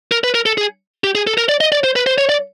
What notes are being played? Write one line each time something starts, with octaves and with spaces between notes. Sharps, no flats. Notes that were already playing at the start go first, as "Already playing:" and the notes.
A#4
B4
A#4
A4
G#4
G4
G#4
A4
A#4
D5
D#5
D5
C5
B4
C5
C#5
D5